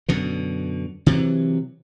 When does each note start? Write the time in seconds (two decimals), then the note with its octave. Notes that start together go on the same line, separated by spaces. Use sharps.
0.09 F#2 B2 D3
1.06 C3 E3 F#3